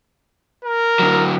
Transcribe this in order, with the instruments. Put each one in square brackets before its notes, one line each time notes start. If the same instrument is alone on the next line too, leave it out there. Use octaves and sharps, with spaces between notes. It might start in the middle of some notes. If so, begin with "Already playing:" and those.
[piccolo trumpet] A#4
[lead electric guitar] D3 F#3